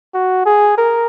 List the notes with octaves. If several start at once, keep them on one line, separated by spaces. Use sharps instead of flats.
F#4
G#4
A#4